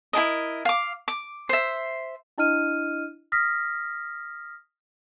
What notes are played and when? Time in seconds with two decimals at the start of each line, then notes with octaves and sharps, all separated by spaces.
0.13 E4 G#4 A#4 D#5
0.65 F5 D6
1.08 D6
1.49 C5 E5
2.38 D4 E4 D#5 F6 D#7
3.32 D#6 F6 A#6 B6